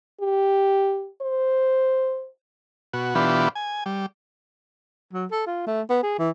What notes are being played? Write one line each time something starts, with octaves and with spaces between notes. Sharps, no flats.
G4
C5
B2 F#4
B2 E3 B3 D4 F4 G4
G#5
G3
F#3
A4
F4
A3
B3
G#4
E3